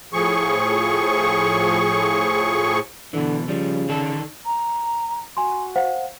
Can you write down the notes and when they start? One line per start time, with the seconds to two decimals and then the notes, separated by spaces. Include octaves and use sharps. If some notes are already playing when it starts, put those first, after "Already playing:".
0.13 A2 F3 G#4 C#6
3.13 B2 D3 E3
3.48 C#3 F3 G3
3.89 D3 D#3 A4
4.46 A#5
5.37 F#4 G#5 C6
5.76 C5 F5 F#5